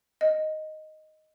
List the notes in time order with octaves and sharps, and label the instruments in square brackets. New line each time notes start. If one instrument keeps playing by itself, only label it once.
[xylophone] D#5